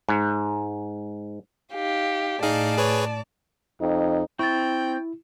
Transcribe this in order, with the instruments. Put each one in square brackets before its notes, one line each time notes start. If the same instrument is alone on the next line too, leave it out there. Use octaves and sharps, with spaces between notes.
[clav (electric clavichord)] G#2
[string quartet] D#4 G4 F5
[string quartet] A2 D5 A5 [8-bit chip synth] D#4 G#4 F5
[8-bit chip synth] G#4 B4 C#5
[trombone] F2 [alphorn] D#4
[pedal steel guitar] C4 [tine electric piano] E4 [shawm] G5 [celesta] C#6 A6